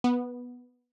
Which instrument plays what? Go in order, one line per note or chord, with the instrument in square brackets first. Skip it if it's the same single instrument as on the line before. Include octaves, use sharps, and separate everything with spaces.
[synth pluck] B3